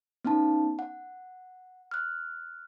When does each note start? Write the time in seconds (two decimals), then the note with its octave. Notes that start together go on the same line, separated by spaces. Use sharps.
0.25 B3 C#4 D#4 A5
0.79 F#5
1.91 F6 F#6